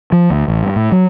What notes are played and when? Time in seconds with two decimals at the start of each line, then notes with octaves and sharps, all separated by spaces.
0.12 F3
0.30 D2
0.48 A1
0.63 G2
0.76 A2
0.92 F#3